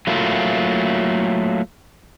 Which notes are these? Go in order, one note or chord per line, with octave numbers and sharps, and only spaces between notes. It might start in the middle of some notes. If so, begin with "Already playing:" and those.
F#3 A3 A#3 E4 F4